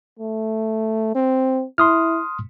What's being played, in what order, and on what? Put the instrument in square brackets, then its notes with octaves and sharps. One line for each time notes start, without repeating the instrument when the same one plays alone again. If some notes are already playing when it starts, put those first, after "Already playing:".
[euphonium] A3
C4
[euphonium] E4 [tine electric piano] C6 D#6 F6